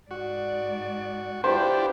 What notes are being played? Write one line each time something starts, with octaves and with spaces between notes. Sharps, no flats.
G#2 F#4 D5
D4 E4 F4 G4 B4 C5